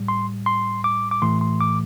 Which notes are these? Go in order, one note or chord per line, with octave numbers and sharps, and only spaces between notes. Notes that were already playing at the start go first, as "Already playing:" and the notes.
Already playing: A2 G3
C6
C6
D6
D6
A2 E3 A3 C6
C6
D6